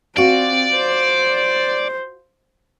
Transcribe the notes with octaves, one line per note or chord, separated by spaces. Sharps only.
C4 F4 F#4 D5
C5